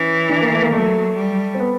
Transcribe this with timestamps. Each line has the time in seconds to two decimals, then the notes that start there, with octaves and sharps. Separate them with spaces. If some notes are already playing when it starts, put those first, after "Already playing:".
Already playing: E3 C#4
0.29 D4
0.41 A#3
0.52 A3
0.62 A#3
0.73 F#3 A3
1.17 G3
1.55 C4
1.60 B3